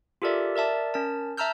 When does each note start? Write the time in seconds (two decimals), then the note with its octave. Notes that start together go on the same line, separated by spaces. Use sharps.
0.22 F4 G4 A4 A#4 D5 E5
0.56 A#4 D5 E5 A5
0.94 C#4 A#4 A5
1.37 E5 A5 A#5 E6 F6 G6